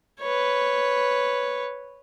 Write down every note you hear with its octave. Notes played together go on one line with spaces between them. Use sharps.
B4 C#5